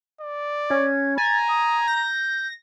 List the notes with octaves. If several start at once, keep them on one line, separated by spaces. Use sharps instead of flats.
D5
C#4 G#6
G#5 A#5 A6
D#6
G6 A#6